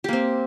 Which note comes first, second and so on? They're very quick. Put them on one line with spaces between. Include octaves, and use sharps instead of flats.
G4 A#3 C4